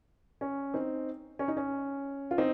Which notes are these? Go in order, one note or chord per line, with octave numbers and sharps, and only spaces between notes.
C#4
C4 D#4
C#4
D#4
C#4
F4
C4 D#4